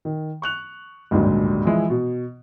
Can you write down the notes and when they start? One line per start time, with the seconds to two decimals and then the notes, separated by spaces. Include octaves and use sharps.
0.05 D#3
0.42 C#6 F#6 F7
1.11 G#1 C#2 G2 A#2 D3 F#3
1.65 E3 F3 G#3 E4
1.90 B2